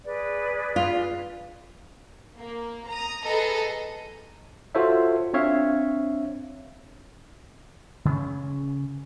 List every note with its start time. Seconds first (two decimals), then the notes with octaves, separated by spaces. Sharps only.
0.05 G#4 B4 D5
0.76 F4
2.38 A#3
2.89 A#5 D#6
3.25 G#4 A4 B4 D#5 A#5
4.75 F4 F#4 A4 C5 C#5 E5
5.34 C4 D4 C#5 E5 F5
8.05 C#3 C4 C#4